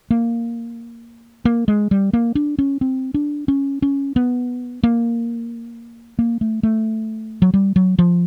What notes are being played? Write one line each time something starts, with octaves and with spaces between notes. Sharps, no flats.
A#3
A#3
G#3
G3
A#3
D4
C#4
C4
D4
C#4
C#4
B3
A#3
A#3
A3
A3
F#3
G3
F#3
F3